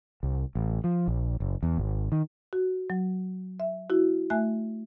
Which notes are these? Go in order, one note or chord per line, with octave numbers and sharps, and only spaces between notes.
C2
A1
F3
A#1
F#1
E2
G#1
D#3
F#4
F#3
E5
E4 F#4
A3 E5 G#5 F#6